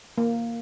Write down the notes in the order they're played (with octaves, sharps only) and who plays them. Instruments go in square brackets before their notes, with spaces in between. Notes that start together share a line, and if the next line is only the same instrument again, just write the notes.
[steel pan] A#3